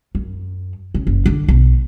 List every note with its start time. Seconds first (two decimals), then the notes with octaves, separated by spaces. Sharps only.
0.15 F#2
0.94 C#3
1.07 F#1
1.26 D3
1.48 B1